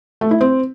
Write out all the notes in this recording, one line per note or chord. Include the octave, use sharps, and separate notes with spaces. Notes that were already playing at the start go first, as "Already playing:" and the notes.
A3
E4
C4